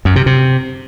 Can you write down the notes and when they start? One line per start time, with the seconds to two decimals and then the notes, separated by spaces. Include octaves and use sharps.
0.05 F#2
0.16 C3
0.26 C3